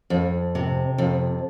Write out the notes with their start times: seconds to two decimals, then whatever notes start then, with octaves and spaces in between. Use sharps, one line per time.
0.10 F2
0.55 C3
0.98 F2